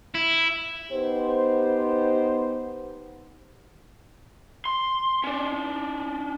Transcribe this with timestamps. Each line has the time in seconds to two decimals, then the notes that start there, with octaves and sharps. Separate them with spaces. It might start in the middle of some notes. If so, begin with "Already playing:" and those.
0.15 E4
0.91 B3 D#4 G4 C5
4.66 C6
5.24 C#4 D4